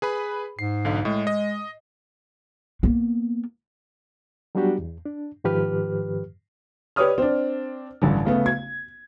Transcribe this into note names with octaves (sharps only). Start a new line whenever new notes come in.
G#4 B4 B5
G#2 C7
B1 D3 F5
A2 G#3
D#5
A#3 B3
F#3 G3 B3 D4 F#4 G4
E2
D4
G#2 D#3 F3 G4 B4 F6
G4 B4 C#5 D5 D#6 F6
C4 D4
A1 G2 D3
C#3 A3 B3
G#6